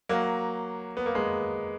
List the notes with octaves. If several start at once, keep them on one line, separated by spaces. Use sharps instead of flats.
F#3 A#3
B3
A#3
G#3 B3